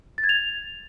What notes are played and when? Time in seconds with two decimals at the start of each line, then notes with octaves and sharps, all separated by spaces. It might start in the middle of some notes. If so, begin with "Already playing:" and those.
0.18 A6
0.24 G#6
0.29 F7